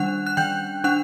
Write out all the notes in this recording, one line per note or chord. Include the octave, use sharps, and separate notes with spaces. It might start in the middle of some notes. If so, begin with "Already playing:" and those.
Already playing: D#3 G3 D4 F#5 F#6
F#6
D#3 G5 G6
D4 F#5 F#6